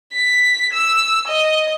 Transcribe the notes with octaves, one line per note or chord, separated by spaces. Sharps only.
B6
E6
D#5